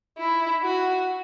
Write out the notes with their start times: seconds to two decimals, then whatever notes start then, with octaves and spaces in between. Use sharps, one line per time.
0.18 E4
0.63 F#4